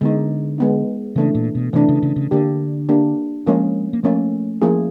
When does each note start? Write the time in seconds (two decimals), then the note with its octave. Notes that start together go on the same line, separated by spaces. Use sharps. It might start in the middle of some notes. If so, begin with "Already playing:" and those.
0.01 D3 G#3 B3 D#4
0.58 G#3 B3 D#4
1.16 C#3 E3 A3 D4
1.35 A#2
1.55 B2
1.73 C3 E3 A3 D4
1.89 C#3
2.03 C#3
2.16 C#3
2.31 D3 A#3 D4 G4
2.89 A#3 D4 G4
3.47 F3 G#3 A#3 C#4
3.93 A#3
4.04 F3 A3 A#3 C#4
4.62 F3 A#3 C#4 E4 G#4